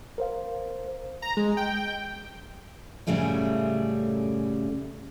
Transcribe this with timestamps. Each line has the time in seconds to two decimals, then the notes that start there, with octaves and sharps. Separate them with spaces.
0.18 A#4 C5 F5
1.22 A#5
1.37 G#3
1.57 G5
3.07 F#2 A2 C#3 G3 A3 C#4